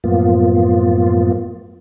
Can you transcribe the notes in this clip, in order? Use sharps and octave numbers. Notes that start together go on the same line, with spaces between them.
F#2 A2 F3 A#3 B3 F4